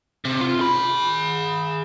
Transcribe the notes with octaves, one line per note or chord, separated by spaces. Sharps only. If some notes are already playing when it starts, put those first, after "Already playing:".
C3
F4
G#4 B5